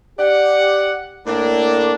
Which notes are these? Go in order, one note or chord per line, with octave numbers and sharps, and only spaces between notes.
G4 D5 F#5
A2 A#3 D4